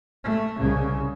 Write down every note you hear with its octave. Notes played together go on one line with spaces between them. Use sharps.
A3
C2 C#3